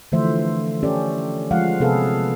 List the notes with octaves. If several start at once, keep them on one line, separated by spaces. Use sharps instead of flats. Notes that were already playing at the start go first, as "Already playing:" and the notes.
D3 E3 F3 A3 C5 E5
C#4 G4 A4 D5
F3 G#3 F5 F#5
C3 B3 G#4 A4 B4 F5